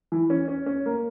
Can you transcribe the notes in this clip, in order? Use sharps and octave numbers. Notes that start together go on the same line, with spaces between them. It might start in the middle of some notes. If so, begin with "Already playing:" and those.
E3
C#4
C#4
C#4
A#3